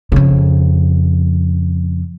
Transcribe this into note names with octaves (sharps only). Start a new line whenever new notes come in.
F2 C#3